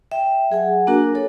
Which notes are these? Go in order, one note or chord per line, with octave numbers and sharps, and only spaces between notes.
E5 G5
F#3 G#4 F#5 G#5
A#3 D4 F#4 A#4
A4 C#5